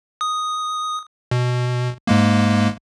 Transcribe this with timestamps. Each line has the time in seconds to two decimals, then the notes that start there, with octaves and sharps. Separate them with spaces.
0.21 D#6
1.31 B2
2.07 G#2 G#3 A#3